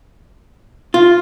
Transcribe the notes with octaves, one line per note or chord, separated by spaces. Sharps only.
F4